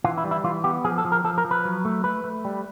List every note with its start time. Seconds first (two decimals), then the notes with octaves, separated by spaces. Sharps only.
0.04 E3 F4
0.18 E4
0.24 G3
0.31 E4
0.44 E3 F4
0.64 B3 G4
0.84 F3 G#4
0.98 A4
1.05 F3
1.12 A#4
1.24 F3 A4
1.38 A#4
1.45 F3
1.51 B4
1.65 F#3
1.85 A3
2.04 A3 B4
2.24 A3
2.45 G3